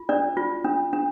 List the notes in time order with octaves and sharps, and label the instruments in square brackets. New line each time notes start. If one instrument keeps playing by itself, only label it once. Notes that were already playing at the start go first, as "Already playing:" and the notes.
Already playing: [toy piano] F4
D4 D5
F4
D4
D4